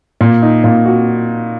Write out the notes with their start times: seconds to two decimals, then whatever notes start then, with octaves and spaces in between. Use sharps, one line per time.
0.21 A#2
0.42 D#4
0.64 A#2
0.86 F#4